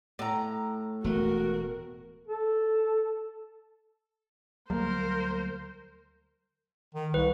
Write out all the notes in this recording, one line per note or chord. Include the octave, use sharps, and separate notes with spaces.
A2 A#5
E1 A3 F#4 A#4
A4
D2 F#3 G3 A#3 A#4 C5
D#3
C2 B4